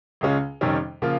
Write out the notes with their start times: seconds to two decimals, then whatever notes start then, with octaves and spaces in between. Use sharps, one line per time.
0.21 C#2 C#3 G#3 C#4 F4
0.61 F2 C3 D#3 G3 C#4
1.02 C#3 F3 A#3 F4